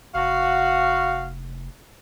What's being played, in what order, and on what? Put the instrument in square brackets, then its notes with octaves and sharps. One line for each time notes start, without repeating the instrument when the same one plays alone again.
[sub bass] F1 [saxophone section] F#4 F5